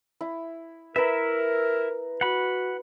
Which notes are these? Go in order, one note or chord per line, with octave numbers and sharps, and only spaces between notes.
E4
E4 A#4 B4 E5 A#5
F#4 F#5 B5